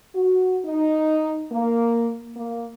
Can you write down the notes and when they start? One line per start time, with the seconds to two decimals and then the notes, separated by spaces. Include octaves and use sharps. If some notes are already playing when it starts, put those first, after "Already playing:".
0.15 F#4
0.64 D#4
1.52 A#3
2.36 A#3